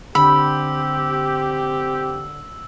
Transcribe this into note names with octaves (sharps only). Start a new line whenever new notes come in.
D3 C4 G4 B5 E6